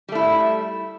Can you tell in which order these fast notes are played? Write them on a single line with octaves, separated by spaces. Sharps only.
G3 A3 E4